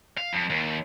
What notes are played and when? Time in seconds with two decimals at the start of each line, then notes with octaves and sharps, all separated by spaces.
0.17 F5
0.33 F2
0.50 D#2